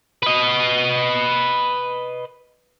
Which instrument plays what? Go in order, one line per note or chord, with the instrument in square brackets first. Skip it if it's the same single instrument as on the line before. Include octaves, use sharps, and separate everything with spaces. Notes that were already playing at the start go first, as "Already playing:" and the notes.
[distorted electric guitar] B4 D#5